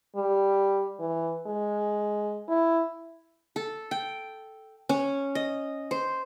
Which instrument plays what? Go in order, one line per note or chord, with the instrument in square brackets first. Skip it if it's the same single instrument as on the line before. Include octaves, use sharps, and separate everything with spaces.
[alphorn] G3
E3
G#3
E4
[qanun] A4
G5
C#4
D#5
C5